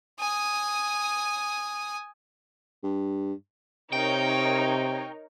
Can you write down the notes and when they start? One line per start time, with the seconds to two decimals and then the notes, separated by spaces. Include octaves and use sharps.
0.20 G#5 D#6
2.83 G2
3.93 C3 D#4 A#4 C#5 G5